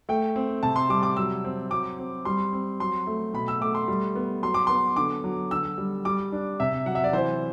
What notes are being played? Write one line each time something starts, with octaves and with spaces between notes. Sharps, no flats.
A3 G5
C4
C3 A5
C6
G3 D6
D6
F#3 E6
C4
F#3 D6
C4
G3 C6
C4
F#3 C6
A3
B2 B5
E6
A3 D6
C6
G3
B3
F#3 C6
D6
B3 C6
D3 D6
F#3
D3 E6
G3
G3 D6
D4
C3 E5
F#3 F#5
E5
D5
E3 C5